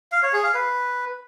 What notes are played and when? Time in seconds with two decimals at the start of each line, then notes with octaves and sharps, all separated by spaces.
0.12 F5
0.22 C#5
0.33 G#4
0.44 F5
0.54 B4